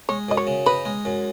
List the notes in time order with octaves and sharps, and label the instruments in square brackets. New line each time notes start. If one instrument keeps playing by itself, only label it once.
[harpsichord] G#3 [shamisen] C#5
[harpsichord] F#2 [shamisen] D#5
[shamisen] C#5
[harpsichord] C#3
[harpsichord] D#4 [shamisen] B4
[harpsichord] G#3
F#2